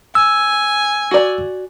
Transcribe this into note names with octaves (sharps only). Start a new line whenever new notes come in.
G#5 E6
F#4 D5